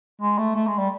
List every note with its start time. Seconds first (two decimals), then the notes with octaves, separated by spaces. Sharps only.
0.21 G#3
0.38 A3
0.56 A3
0.67 G#3
0.78 G3